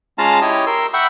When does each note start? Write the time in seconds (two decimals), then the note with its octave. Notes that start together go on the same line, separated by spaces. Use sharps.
0.18 G#3 C#4 F4 F5 A5 A#5
0.41 E4 G4 C#5 D#5
0.67 A#4 C6 E6
0.94 E5 F#5 G5 B5 C#6 E6